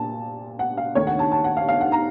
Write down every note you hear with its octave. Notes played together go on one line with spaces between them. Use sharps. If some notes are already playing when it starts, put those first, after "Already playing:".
Already playing: A#2 A5
F#5
F5
D#2 D#3 A3 C#5
F#5
A5
A5
F#5
F5
F5
F#5
A#5